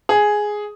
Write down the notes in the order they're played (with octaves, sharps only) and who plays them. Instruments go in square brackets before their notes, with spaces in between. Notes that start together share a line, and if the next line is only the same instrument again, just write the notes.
[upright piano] G#4